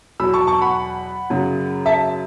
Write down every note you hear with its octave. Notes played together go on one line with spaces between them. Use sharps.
E2 B2 F#3 B5 E6
A5 C#6
A5 C#6
F#5 B5
F#2 C#3 F#3
E5 A5